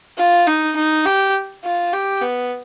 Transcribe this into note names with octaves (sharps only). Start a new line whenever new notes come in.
F4
D#4
D#4
G4
F4
G4
B3